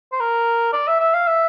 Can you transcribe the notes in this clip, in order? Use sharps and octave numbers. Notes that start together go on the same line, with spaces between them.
C5
A#4
D5
E5
E5
F5
E5